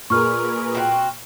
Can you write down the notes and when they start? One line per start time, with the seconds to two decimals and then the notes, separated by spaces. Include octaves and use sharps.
0.10 A#2 G#4 A#4 B4 C#6 F6
0.75 C4 F#4